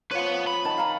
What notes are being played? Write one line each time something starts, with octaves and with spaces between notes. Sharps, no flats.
F3 B4 C#5 F#5
B5
D#3 A5
F5 A#5